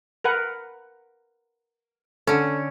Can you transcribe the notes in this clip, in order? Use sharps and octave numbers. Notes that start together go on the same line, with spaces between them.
A#4 B4 F#5
D3 C#4 A4